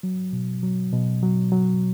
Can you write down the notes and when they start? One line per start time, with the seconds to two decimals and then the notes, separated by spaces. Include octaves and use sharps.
0.03 F#3
0.33 B2
0.62 F#3
0.93 B2
1.22 F#3
1.52 F#3